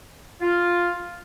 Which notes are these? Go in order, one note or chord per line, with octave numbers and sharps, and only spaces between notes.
F4